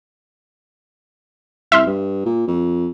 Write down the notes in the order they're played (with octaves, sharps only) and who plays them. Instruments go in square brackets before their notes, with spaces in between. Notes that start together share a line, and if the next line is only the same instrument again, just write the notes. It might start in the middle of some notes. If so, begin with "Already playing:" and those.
[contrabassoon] C2 [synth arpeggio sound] E5 C6 F6
[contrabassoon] G2
A#2
F2